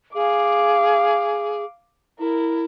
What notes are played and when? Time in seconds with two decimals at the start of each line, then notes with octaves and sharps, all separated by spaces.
0.15 G#4 F5 D6
2.19 E4 A#4